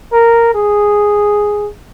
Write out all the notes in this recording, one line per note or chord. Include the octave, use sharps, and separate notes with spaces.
A#4
G#4